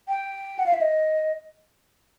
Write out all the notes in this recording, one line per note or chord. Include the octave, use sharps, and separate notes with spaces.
G5
F#5
F5
E5
D#5